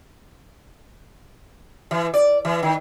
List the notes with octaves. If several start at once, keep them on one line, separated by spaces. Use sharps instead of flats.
E3
D5
E3
D#3